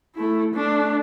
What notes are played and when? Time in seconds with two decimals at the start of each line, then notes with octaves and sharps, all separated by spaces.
0.16 A3 E4
0.54 A3 D4